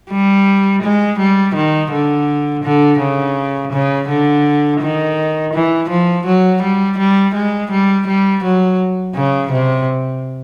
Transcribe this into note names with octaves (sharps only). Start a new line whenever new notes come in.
G3
G#3
G3
D#3
D3
D3
C#3
C#3
D3
D#3
E3
F3
F#3
G3
G3
G#3
G3
G3
F#3
C#3
C3